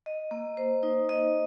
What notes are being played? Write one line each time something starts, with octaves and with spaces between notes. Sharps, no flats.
D#5
A#3
C5
D#4
D#5